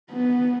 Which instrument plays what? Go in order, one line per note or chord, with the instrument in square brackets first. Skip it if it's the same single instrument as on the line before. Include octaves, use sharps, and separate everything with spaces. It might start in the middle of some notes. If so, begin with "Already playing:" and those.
[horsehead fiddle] B3